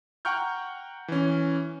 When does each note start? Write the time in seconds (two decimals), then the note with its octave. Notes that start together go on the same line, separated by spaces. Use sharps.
0.25 F#5 G5 A#5 C#6 F6 G6
1.08 E3 C#4